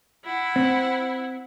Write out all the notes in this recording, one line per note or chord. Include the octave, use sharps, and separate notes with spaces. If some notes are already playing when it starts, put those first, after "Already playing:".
E4 F#5
C4